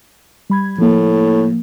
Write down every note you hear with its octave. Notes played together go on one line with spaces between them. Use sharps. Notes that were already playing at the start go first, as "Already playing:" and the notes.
G3 B5 G#6
A2 F3 A#3